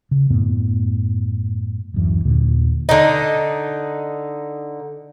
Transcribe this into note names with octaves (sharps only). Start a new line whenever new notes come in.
C#3
F#2 A2 B3
D1 F#2 E3
D#2 A#2 D3
D3 D#4